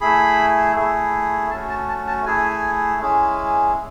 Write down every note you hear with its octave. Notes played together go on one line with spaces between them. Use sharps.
A3 E4 G#4 B5
A3 E4 G#4
A3 C#4 F#4 A5
A5
A5
A5
A3 E4 G#4 G#5
G#3 C#4 E4 G#4